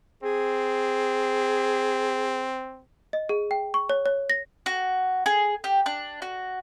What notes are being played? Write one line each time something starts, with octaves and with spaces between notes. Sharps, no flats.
C4 G#4
D#5
G#4
G5
C#6
C#5
C#5
A#6
F#4
G#4
G4
D4
F#4